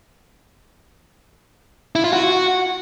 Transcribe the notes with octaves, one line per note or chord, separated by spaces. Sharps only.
E4
F4
F#4